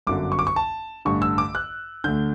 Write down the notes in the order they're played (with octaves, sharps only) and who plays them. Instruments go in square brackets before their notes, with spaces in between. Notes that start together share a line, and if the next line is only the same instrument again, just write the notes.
[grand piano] G1 F#2 D3 D6
C#6
D6
C#6
A5
A1 G2 D3 C#6
E6
D6
F#6
D2 D3 G6